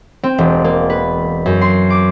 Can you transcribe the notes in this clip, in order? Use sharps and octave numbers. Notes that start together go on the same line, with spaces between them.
C4
E1
A#3
B4
F#2
C6
D6